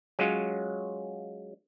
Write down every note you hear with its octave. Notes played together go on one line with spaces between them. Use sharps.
F#3 G#3 C#4 F4